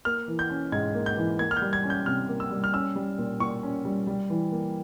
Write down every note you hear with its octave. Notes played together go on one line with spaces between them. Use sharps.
A#3 F6
E3
G6
C#4
G#2 G#6
A#3
G6
E3
A#3 G#6
F6
G6
G3
G#6
C#4
G6
C3 F6
A#3
E6
G3
F6
C#4 E6
G3
A#2
A#2 C#6
C#4
G3
G3
E3
A#3